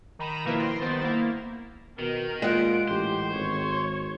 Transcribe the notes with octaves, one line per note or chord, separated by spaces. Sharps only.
D#3 A#5 B5 D#7 E7
B2 D#3 F3 A#3 E4 B4
C6 A#6 C7 D7
G1 D#3 B3 C5 A6
A#3 E4
B2 D#3 A#4
A#2 G#3 F4 F#5 D7
A1 G4 C5
G#1 C#5